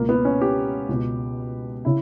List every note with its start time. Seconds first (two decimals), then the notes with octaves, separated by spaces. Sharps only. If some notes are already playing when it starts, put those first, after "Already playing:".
Already playing: C#2 B2 A#3
0.09 B3
0.25 C#4
0.41 G4
0.89 C#2 B2
1.85 C#3 E4